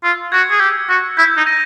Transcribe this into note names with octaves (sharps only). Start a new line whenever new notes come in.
F4 E6
F#4 G#6 C#7
G#4
G4 E6
F#4 G#6 C#7
E4 G6
D#4
A#6 D#7